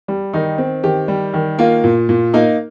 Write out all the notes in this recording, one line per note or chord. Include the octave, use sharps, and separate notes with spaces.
G3
D#3 D#4
C4
D#3 G4
G3
D#3
A#3 F4
A#2
A#2
A#3 D#4